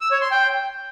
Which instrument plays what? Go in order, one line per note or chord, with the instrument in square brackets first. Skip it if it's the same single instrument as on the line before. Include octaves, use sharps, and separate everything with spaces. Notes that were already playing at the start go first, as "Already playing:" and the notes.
[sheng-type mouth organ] E6
C#5
C6
G5